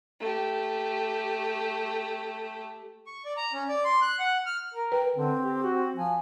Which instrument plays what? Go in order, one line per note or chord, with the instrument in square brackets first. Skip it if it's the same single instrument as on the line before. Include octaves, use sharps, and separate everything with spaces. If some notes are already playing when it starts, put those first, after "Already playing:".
[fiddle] A3 G4
[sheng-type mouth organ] C#6
D5
A#5
C#4
D5
C6
F#6
F#5
F6
[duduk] A#4
[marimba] B4 [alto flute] G5
[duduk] D3 [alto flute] C4
[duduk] G4
F#4
[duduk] F3 [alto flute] G#5